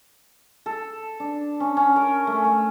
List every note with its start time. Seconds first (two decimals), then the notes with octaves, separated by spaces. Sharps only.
0.66 A4
1.20 D4
1.60 C#4
1.77 C#4
1.96 A#4
2.27 A3
2.44 A3